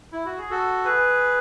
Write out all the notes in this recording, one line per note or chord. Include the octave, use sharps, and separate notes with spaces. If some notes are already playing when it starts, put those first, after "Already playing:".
E4
F#4
G#4
F#4 A4
G#4 B4